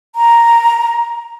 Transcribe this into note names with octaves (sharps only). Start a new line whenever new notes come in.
A#5